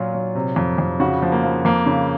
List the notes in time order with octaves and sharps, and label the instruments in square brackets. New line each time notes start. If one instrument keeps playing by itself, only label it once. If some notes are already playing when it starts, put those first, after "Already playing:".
Already playing: [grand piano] A#2 F#3 F4
F#3
C3
F2
F2
C#3 F#4
F3
A#3
F3
F2 A#3
C#3